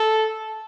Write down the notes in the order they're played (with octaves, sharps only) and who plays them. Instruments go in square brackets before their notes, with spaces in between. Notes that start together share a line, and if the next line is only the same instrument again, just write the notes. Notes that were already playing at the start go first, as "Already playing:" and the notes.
Already playing: [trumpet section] A4